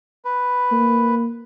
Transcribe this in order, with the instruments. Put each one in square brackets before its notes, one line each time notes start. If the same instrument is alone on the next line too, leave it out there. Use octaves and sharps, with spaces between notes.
[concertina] B4
[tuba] A#3